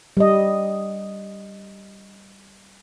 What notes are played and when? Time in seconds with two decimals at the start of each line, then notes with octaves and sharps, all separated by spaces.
0.17 G3 D#5